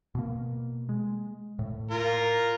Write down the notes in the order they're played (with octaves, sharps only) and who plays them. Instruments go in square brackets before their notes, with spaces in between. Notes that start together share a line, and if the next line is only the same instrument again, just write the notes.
[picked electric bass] B2 A#3
G#3
A2
[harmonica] F4 A#4